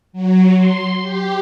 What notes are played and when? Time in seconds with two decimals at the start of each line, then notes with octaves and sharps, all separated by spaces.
0.13 F#3
0.55 C6
1.02 G4